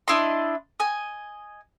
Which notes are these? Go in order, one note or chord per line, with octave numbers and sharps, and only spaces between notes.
D4 E4 D#5 C6
D#5 G#5